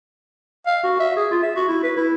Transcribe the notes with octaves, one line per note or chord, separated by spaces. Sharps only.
F5
F#4
E5
G#4
F4
E5
F#4
E4
B4
E4